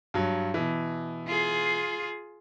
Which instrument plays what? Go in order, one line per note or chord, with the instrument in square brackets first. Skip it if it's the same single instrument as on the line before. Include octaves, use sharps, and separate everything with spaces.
[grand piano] G2 F#3
B2 E3
[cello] F4 G#4